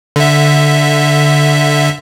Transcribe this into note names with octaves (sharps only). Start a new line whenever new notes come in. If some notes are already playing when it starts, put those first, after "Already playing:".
D3 E5